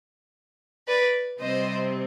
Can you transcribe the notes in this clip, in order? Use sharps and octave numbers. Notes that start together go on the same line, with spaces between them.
B4 D5
C3 G3 C4 C5 D#5